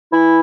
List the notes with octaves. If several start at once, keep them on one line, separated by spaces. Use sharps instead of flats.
E3 E4